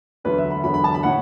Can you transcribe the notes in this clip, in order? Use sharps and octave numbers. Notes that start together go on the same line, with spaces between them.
E1 D2 D3 F#3 B4
E5
B5
E1 D2 D3 F#3 B5
B5
A5
B5
A2 F#5